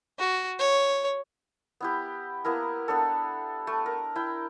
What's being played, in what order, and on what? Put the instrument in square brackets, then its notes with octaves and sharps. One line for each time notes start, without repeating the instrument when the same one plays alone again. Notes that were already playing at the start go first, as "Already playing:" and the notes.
[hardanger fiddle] F#4
C#5
[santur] B3 E4 G4
A#3 B3 E4 A#4
B3 D4 A4
A3
A#4
E4 G5